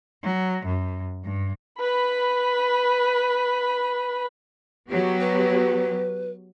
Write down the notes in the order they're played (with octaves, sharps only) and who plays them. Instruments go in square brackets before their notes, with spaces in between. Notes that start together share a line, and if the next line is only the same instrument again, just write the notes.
[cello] F#3
F#2
G2
[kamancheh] B4 B5
[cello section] F#3 B3 G4
[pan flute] B4